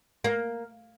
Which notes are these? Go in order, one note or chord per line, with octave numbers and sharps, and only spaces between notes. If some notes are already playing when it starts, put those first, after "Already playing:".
A#3